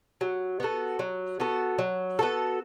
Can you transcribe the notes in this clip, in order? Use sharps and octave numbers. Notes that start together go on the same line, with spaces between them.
F#3
B3 F#4 A4
F#3
B3 F#4 A4
F#3
B3 F#4 A4